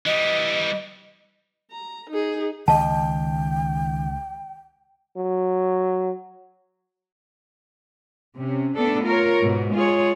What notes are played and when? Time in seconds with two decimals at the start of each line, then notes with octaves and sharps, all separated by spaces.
0.06 E3 G3 D#5
1.72 A#5
2.10 D#4 G#4
2.68 C#2 D#3 D#5 G5 A5
5.17 F#3
8.37 C3 C#4
8.76 A3 B3 D4 A4
9.05 F4 A#4 C#5
9.42 G#2 B2
9.75 G#3 F4 G#4 C#5